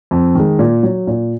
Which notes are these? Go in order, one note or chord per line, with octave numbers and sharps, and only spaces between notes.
F2
D#3 G#3
A#2
F#3
A#2